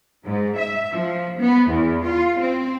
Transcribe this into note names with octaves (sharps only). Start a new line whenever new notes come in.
G#2
E5
F3
B3
E2
F4
C4